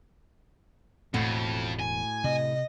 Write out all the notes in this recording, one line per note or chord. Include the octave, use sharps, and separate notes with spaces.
E1 F2 A2 A3 C4 F#4
G#5
C3 D#5